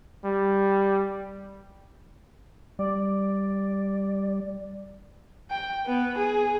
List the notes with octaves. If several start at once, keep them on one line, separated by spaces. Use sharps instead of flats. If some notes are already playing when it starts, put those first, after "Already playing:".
G3
G3 D5
G5
B3
G#4